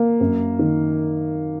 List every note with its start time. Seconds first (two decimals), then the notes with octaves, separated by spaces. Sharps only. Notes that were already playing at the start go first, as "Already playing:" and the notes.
Already playing: A#3
0.20 F#2
0.59 D#3